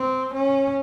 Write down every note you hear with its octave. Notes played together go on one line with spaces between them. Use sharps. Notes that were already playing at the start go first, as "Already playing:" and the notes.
Already playing: C4
C#4